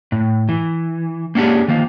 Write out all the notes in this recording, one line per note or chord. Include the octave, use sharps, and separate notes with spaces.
A2
E3
A#3 C#4 D4 G4 G#4
D#3 F3 A#3